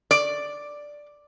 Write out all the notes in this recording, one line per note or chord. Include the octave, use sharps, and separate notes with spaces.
D5